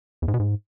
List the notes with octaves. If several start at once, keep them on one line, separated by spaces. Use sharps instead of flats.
E2
G#2
B2
G#2